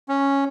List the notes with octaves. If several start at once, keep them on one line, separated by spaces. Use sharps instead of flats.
C#4